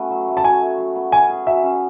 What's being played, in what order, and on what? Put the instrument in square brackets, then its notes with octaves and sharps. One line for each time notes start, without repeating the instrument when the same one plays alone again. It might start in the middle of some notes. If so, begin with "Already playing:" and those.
Already playing: [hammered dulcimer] A3 B3 C#4 F#4
F#3
A3
[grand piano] A5
[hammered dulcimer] F#3 [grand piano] G#5
[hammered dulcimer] A3
F#3
B3
[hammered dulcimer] C#4 [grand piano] G#5
[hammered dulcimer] G#4
[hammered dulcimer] F#3 [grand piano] E5
[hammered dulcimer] C#4